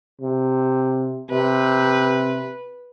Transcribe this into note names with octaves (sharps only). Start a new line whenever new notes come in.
C3
C3 B4